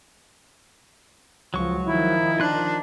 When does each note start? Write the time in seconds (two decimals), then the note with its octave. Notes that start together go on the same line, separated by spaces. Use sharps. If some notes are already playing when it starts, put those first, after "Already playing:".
1.54 C#2 F3 F#3 C#6
1.83 D#3 F3 E4
2.40 D4 D#4 F4 F#6